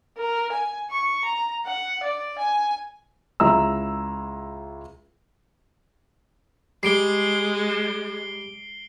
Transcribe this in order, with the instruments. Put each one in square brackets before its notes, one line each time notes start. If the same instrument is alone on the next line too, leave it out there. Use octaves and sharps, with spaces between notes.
[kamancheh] A#4
G#5
C#6
A#5
F#5
D5
G#5
[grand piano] C#2 E4 A#5 E6
[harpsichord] G3 [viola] G#3 [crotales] C7 D7 G7